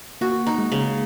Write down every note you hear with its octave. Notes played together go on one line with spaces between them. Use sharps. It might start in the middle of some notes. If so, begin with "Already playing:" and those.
A#3 F#4
D#4
G#3
C#3